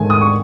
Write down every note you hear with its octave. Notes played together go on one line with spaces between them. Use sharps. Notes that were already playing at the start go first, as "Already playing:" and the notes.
Already playing: G#2 D#3 A3 G#5
D#6
C#6